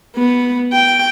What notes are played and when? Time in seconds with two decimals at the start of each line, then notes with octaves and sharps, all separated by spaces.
0.16 B3
0.73 G5